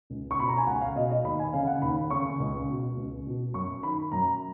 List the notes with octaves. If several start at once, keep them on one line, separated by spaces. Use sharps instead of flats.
C#2
C#6
B2 B5
A#5
G#5
C#2 F#5
F5
B2 D#5
D#5
D#2 B5
G#5
C#3 F5
F#5
D#2 B5
C#3 C#6
C#2
B2
C#2
B2
F#2 C#6
D#3 B5
F#2 A#5